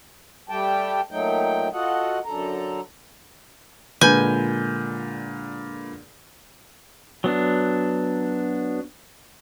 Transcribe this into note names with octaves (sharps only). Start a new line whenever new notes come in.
G3 A3 G4 G5 A5
A#2 F#3 A3 D#4 G5
F4 F#4 A4 D#5 F#5
F#2 D3 A4 A#5
A#2 D3 G#3 F4 B4 G#5 G6
F#3 B3 D4